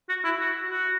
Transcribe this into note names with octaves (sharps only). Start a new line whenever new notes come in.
F#4
E4
F#4
F#4